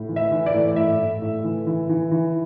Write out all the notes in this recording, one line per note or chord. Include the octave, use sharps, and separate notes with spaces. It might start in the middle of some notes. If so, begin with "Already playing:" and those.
Already playing: A2
E3
E5
E3
D5
A2
A2 E5
A2
A2
E3
E3
E3
E3